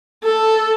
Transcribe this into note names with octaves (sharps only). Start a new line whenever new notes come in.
A4